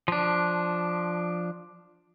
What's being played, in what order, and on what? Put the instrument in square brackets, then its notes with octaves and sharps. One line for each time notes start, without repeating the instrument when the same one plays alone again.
[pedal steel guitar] F3 D4